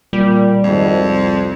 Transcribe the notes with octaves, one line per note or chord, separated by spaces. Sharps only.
A#2 G3
G#1 F2
C2